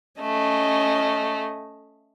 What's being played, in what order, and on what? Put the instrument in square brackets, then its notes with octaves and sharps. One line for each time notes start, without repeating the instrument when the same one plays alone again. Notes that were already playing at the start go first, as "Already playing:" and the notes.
[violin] A3 [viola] C#4 D#5